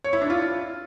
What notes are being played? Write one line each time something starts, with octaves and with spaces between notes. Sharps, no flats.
C#5
E4
D4
F4